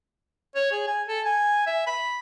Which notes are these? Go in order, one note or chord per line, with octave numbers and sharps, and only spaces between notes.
C#5
G#4
G#5
A4
G#5
E5
B5